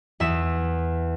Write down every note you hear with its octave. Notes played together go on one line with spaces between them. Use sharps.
E2 E5 E7